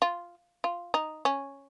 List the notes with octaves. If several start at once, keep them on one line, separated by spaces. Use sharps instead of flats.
F4
F4
D#4
C#4